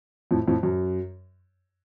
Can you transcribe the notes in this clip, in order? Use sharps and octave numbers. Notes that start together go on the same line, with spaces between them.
F2 A2
F2 A2
F#2